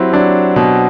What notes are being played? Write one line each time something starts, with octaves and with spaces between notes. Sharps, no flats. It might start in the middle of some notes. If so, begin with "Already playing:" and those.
Already playing: F#3 C4 E4 G4
F#3 D4
B2